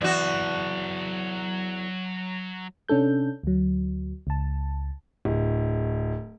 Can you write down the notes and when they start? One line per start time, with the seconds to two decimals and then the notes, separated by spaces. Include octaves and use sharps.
0.02 E2 F#3 F#4 A5
2.88 C3 C#4 D4 A4 G6
3.43 D2 F#3
4.27 C#2 A5
5.25 D1